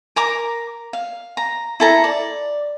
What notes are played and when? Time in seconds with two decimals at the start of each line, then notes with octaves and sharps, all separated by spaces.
0.16 A#4 A#5 D6
0.93 F5
1.37 A#5
1.80 E4 A4 A#5
2.04 D5